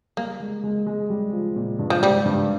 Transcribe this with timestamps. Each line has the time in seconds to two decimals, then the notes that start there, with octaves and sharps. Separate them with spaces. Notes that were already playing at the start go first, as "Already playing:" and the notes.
0.17 G3 A#3
0.40 G#3
0.64 G#3
0.86 G#3
1.10 G3
1.33 F3
1.56 A#2
1.79 G2
1.90 F3
2.02 G#2 G3
2.25 G2